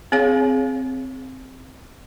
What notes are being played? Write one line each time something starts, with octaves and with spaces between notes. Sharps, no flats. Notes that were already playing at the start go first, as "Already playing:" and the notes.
C4 G#4 C#5 F5